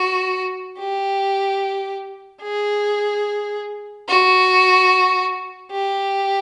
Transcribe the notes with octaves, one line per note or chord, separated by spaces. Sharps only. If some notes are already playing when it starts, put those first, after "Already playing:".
Already playing: F#4
G4
G#4
F#4
G4